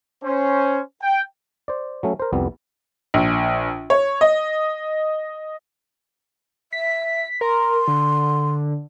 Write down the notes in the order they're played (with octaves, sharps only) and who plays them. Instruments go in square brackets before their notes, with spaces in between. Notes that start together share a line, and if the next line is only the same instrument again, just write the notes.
[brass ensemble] C#4 C5
G5
[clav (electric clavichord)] C5 D5
F#3 A3 C#4
A#4 C5
C2 F2 G3 B3
[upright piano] A#1
C#5
D#5
[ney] E5 [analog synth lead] B6
[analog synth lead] A#4 [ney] C6
[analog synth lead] D3